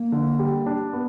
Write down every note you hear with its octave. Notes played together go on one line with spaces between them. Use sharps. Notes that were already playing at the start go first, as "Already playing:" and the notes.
Already playing: A#3
D3
G3
D4
B3